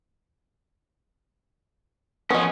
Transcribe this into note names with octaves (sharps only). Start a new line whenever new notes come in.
F3 B3 C#4 D#5